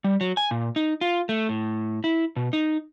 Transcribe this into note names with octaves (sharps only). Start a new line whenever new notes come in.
G3
F#3
G#5
A#2
D#4
F4
A3
A2
E4
B2
D#4